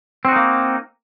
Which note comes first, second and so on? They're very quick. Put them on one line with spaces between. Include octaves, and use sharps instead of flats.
C4 F#4 D#4 A#3